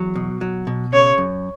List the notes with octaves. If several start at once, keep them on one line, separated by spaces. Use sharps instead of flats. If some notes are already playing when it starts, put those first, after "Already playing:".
Already playing: E2 F#3
B2
F#3
B2
C#3 C#5
F#2